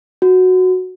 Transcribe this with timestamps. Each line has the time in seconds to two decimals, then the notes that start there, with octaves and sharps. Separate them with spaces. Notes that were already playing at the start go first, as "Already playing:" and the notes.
0.22 F#4